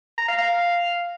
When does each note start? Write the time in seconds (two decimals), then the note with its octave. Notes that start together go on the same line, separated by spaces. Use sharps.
0.18 A#5
0.28 F5
0.38 F5